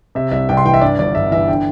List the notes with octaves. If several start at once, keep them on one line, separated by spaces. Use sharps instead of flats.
C3 E5
C2 E5
C2 G5
C6
E3 G5
E5
G2 D5
G1 D5
G1 E5
E3 E5
D3 G5